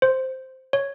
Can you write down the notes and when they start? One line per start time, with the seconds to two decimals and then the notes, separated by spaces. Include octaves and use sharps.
0.02 C5
0.73 C#5